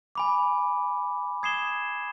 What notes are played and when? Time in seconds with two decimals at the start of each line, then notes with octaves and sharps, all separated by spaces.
0.15 G#5 B5 D6
1.43 D#6 G#6 C7 E7 G7